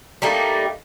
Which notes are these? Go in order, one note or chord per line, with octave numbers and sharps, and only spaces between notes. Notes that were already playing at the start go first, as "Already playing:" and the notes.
G3 A3 A#3 D#4